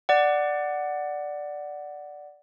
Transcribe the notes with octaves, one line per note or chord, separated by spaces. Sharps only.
D5 F#5